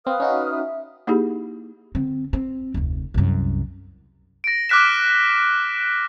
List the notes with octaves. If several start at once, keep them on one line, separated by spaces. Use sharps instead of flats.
C4 B4 F5 D#6 F6
C#4 D#4 F#4
E5
A#3 D#4 E4 G4 G#4
D3 C4
C4
F1 D2
C2 F#2
A#6 D7
D6 F6 F#6 B6 E7